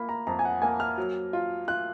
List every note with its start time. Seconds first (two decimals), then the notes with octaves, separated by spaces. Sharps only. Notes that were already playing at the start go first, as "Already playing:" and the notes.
Already playing: A#3 F4 B5
0.09 A#5
0.27 F2 A#5
0.39 G#5
0.45 F#5
0.62 A#3 G#5
0.80 F6
0.98 F#3
1.33 F4
1.68 F4 F#6